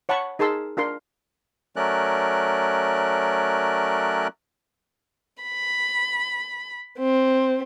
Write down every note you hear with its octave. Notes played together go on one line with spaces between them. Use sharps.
C#5 F#5 A5 B5 C#6
D#4 G#4 A#4 A5 C6 E6
D4 F4 A#4 C6
F#3 A3 C#4 A#4 D5 F#6
B5
C4